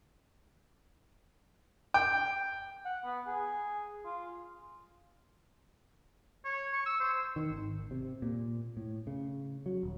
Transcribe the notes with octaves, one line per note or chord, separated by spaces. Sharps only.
G5
F#5
B3
G#4
F4
C#5
C#6
E6
C5
D#3
G#1
C3
A#2
A2
C#3
F#3
D#1